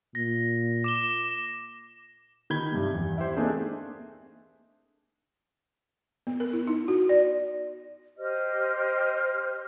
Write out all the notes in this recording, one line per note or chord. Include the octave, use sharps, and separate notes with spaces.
A#2 A#6
D6 E7 G7
D#3 B5 G#6 G7
G2 C3 G3
E2
E4 G4 C5
A3 A#3 C4 D4 D#4 G#4
B3
A#4
E4
D#4
F#4
D5
G4 C5 D#5 F6